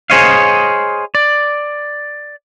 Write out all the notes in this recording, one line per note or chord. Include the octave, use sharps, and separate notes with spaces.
G#4 C5 C#5 D#5 F5
D5